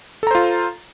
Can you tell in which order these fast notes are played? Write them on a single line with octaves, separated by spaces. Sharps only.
A4 A#5 C5 F4